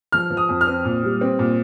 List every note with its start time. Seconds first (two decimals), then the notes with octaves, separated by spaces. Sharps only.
0.12 F3 F6
0.30 F3
0.37 D#6
0.49 F2
0.61 F6
0.67 C4
0.85 A#2
1.03 G3
1.21 C4
1.39 A#2